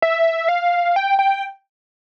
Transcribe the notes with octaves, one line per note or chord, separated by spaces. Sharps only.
E5
F5
G5
G5